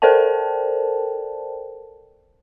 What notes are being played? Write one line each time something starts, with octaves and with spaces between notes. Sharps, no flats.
A4 A#4 C5 D5 G5 A5